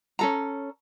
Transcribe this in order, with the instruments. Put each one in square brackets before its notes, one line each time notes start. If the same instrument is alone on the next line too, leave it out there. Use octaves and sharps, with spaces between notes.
[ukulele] C#4 A4 A#5